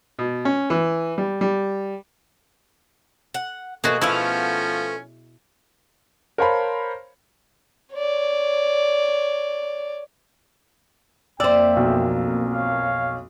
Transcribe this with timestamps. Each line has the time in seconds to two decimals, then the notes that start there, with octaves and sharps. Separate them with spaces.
0.19 B2
0.45 C#4
0.70 E3
1.18 G3
1.41 G3
3.34 F#5
3.84 B2 F3 A3 A#3 F#4 G#4
4.01 F3 A3 B3 C#4 E4 F5
6.38 A#4 C5 C#5 F5 A5 B5
7.94 C#5 D5
11.40 F2 A#3 C5 D5 E5 G5 E6
11.76 B1
12.53 C#5 F5